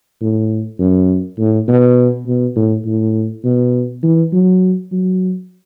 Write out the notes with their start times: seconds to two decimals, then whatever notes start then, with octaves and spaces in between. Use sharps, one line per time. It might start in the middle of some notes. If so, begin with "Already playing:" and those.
0.21 A2
0.79 F#2
1.39 A2
1.68 B2
2.27 B2
2.56 A2
2.86 A2
3.44 B2
4.03 E3
4.33 F#3
4.92 F#3